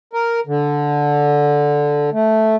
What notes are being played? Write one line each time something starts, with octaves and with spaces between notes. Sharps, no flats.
A#4
D3
A3